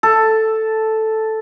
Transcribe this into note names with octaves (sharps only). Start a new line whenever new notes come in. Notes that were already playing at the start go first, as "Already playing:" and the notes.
A4